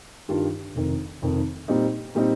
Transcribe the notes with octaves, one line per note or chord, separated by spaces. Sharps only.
G2 D#3 G3 D4 F4
F1 F2 D#3
F1 F2 D#3
A#2 G3 C4 D#4
A#2 G3 C4 D#4